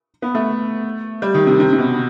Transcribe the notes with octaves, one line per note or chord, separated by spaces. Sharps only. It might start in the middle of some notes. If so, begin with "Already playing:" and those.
B3
A3
G3
D#3
C3
C3
C3
B2